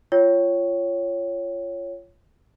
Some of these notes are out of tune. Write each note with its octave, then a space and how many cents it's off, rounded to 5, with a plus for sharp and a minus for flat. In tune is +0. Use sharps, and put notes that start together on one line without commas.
F4 -20 C#5 +0 G5 -5